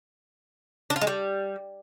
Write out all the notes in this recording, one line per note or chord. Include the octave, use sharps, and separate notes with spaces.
D4
F4
G#3
G3